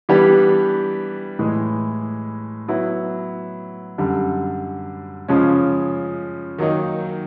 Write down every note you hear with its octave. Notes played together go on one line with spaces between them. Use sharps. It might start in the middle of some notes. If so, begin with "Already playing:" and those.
E3 G3 B3 D4 G4
A2 E3 G#3
F#3 B3 E4
F#2 D3 G3
C#3 F3 G#3 C#4
D#3 F#3 A#3 D#4